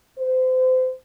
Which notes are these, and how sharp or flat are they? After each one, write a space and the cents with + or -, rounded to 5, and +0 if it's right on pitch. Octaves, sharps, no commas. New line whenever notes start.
C5 -30